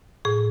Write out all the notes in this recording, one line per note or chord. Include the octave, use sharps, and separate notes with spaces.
A2 G#4